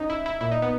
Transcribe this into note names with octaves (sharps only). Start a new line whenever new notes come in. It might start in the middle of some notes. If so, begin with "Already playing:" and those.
Already playing: C#4 D#4
E4
E4
A#2 E4
D#4
B3